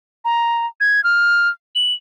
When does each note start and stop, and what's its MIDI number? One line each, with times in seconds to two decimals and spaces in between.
0.25 0.66 82
0.81 1.03 92
1.04 1.49 89
1.75 1.94 102